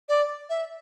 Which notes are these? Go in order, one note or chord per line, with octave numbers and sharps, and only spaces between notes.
D5
E5